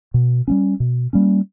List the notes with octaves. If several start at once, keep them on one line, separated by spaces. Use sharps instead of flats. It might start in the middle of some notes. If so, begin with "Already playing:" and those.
B2
G3 A#3 C#4
B2
G3 A#3 C#4